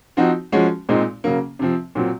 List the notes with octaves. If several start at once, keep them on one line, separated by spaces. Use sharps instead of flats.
F3 C4 D#4 F#4
F3 G#3 C#4 F#4
A#2 G#3 C4 D#4
C#3 F#3 A#3
C3 F3 C4
A#2 F#3 C4